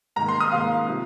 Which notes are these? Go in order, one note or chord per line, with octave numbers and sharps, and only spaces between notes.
G#2 D#3 A#3 A#5
C6
D#6
G#2 D#3 A#3 F5
C3 F3